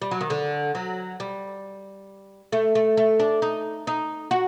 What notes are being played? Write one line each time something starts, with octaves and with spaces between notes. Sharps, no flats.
G3
F#3
D#3
D3
F#3
G3
A3
A3
A3
D4
D#4
D#4
F#4